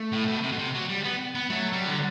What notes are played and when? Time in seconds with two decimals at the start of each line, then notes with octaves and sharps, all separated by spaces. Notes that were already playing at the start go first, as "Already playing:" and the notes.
Already playing: A3
0.13 A2
0.27 B2
0.43 C3
0.52 B2
0.58 C3
0.74 F#3
0.89 G3
1.04 B3
1.35 B3
1.50 F#3 A3
1.73 G3
1.85 D3